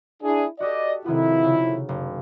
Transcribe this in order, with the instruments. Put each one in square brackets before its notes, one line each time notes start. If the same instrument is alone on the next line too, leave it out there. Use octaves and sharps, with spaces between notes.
[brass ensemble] D4 E4 G#4
[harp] F#4 G4 A4 [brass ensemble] D5 D#5
[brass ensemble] F2 E4 [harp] C3 D#3 B3
[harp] C#3
F#1